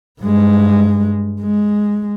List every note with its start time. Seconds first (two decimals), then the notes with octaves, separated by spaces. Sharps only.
0.21 G2 G#3
1.42 G#3